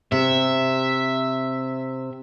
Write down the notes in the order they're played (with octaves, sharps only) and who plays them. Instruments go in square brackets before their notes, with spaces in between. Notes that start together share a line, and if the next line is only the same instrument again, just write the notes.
[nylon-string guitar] C3 [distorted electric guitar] E5